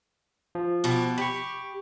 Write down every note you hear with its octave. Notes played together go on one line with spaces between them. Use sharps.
F3
B2 F#4 G4
G4 B5 C#6